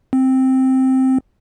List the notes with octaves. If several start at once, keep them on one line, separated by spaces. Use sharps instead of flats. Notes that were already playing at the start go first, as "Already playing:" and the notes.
C4